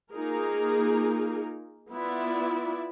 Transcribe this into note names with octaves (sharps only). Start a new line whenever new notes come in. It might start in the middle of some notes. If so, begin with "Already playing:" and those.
A#3 D#4 F4 G#4 A#4
B3 E4 F4 D5 E5